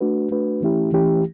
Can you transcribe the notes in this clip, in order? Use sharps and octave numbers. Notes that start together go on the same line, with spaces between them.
A3 D4 F#4 B4
A3 D4 F#4 B4
E3 A3 C#4 E4 G4
E3 A3 C#4 E4 G4